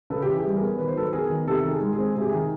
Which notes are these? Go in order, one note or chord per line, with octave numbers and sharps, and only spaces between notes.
C#3 A4 B4
G4
E3
G#4
G3
G#4 A#4
B3
D#3 B4
C5
F#3 A4 B4
B3 G#4 A#4
D#3
C3 G4 A4
D#3 A4
G#4
G#3
G#4
C4
C3 G#4
G4
G#4
D#3